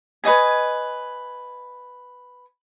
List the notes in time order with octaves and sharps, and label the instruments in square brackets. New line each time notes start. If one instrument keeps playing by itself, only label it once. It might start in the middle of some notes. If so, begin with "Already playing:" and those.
[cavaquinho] B4 C#5 D#5 G#5